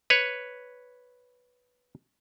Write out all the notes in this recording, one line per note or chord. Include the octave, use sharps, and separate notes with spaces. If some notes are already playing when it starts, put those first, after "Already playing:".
B4 C#5